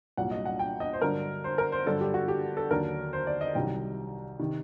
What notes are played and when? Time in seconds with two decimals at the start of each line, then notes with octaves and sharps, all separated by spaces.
0.17 C2 A#2 F#3 F#5
0.31 D#5
0.45 F#5
0.59 G5
0.80 D#5
0.93 C5
1.01 G2 D3 F#3 A#4
1.44 C5
1.58 A#4
1.72 C5
1.86 G2 D3 F#3 A4
2.01 G4
2.14 F#4
2.28 G4
2.57 A4
2.71 D#2 D3 F#3 A#4
3.13 C5
3.27 D5
3.41 D#5
3.55 C2 C3 D#3 F#3 G5
4.39 C3 D#3